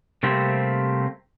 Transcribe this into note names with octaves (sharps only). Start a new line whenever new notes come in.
C3 G3 A3 A#3 C4 G4